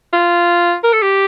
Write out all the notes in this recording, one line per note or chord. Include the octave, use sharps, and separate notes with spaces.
F4
A#4
A4
G4